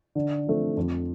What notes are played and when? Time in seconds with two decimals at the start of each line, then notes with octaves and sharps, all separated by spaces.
0.15 D3
0.47 F3 A3 C4
0.77 F2